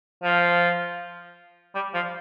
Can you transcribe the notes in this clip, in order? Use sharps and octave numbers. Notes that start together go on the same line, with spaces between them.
F3
G3
F3